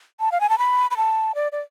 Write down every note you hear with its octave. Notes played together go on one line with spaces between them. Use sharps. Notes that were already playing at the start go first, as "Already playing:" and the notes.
A5
F5
G#5
A5
B5
B5
A5
D5
D5